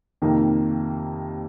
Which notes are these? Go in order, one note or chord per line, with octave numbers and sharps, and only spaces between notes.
F2 C3 D#3 A#3 D#4